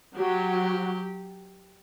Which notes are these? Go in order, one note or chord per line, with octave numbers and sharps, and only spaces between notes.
F#3 G4